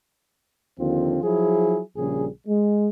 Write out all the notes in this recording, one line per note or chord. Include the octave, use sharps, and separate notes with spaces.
D#2 D3 F3 C4 F4
F3 F#3 E4 G#4
A#1 C#3 G3 G#4
G#3